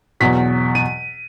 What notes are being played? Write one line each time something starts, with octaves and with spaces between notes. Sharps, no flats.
E2 B2 F#3 B6
D#7